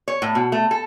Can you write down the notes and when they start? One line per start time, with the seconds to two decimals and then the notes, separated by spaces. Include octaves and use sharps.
0.08 C#5
0.22 A2
0.35 B2
0.52 A3
0.71 A4